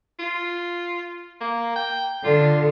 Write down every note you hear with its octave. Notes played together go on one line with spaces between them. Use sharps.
F4
A#3
G5
D3 F4